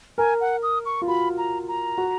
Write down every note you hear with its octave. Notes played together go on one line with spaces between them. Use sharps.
A#4 G#5
F#5
D#6
C#6
F4
F#4 B5
A#5
A#5
F#4